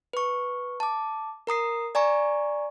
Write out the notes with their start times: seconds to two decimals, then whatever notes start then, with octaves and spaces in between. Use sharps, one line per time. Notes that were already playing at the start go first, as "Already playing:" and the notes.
0.13 B4 C#6
0.80 A5 D6
1.47 A#4 A#5 D#6 C7
1.95 D5 G#5 A#5 C#6